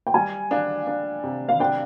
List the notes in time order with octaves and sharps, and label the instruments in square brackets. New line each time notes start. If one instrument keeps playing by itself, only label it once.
[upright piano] G5
[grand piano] G3 [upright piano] G#5
[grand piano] D4 [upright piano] F5
[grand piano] D4
C3
[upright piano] F5
[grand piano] D4 [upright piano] G5